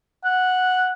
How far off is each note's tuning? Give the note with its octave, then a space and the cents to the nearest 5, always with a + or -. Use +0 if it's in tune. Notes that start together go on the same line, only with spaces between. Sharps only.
F#5 -5